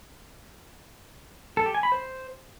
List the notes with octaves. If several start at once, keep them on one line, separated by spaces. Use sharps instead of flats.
A4
G4
G#5
B5
C5